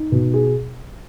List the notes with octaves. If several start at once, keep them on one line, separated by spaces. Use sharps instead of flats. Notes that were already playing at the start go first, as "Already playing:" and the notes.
Already playing: D#4
B2
G#4